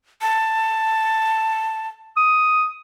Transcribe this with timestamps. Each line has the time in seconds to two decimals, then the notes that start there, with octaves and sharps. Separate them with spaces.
0.22 A5
2.17 D#6